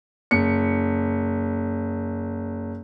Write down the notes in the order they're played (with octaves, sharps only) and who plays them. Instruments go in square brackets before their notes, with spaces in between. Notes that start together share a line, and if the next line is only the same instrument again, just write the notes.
[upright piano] F#1 C#7